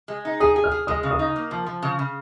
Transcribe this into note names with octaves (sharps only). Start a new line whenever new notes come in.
G#3
D#4
G#4 D#6
G#4
F6
G#4
G#3 D#6
C#3
D#6
D#4
A#3
F3
F3
C#3
C#3